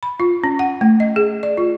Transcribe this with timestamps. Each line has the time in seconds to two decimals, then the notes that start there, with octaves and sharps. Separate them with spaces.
0.03 B5
0.20 F4
0.44 C#4
0.59 F#5
0.81 A3
1.00 D#5
1.16 G#4
1.43 D5
1.57 F4